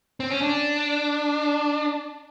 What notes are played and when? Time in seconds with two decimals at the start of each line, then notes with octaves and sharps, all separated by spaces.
0.20 C4
0.30 C#4
0.42 D4